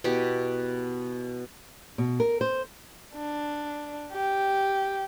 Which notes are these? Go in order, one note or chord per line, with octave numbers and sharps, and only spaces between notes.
B2 B3 E4 G4
B2
A#4
C5
D4
G4